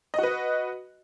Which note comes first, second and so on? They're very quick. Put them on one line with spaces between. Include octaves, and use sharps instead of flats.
D#5 F#4 B4